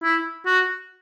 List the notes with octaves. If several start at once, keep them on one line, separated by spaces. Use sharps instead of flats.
E4
F#4